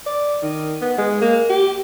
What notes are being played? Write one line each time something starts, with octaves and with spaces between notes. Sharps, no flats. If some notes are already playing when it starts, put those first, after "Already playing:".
D5
D#3
B3
G#3
A#3
G4